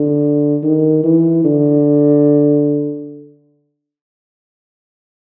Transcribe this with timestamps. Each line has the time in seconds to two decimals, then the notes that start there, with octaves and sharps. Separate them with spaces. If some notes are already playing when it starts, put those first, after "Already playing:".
Already playing: D3
0.63 D#3
1.04 E3
1.44 D3